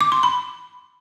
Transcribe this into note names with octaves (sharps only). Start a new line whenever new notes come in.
D6
C6
B5